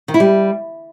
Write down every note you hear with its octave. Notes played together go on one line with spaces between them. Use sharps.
D#3
E4
G3